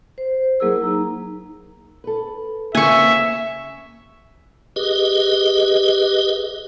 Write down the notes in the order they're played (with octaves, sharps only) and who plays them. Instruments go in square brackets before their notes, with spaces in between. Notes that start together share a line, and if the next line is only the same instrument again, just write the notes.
[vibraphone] C5
F#3 A#3 E4 G#4 A#4 E6
D#4 A#5
[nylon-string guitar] A4 B4
[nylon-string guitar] C#3 A#3 C4 [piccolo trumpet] E5 [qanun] G#5 C#6
[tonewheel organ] G4 G#4 B4 D#5